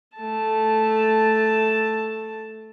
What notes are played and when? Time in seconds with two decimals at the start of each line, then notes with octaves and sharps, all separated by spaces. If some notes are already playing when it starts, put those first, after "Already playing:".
0.17 A3 A5